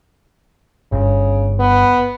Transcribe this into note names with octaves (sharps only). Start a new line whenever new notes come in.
G1 C#3
B3